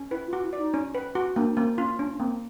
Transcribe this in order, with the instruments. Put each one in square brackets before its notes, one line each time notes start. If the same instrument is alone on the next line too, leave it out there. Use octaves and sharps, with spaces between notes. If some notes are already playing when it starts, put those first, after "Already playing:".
Already playing: [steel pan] C#4
[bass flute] E4 [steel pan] B4
[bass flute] F4
[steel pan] F#4
[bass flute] E4
[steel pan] D5
[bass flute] D#4
[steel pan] C#4
B4
F#4
[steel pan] A#3 [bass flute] D4
[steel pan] A#3 [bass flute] C#4
[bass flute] C#4 [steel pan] F4
[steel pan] C#4 [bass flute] D4
[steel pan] A#3 [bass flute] C4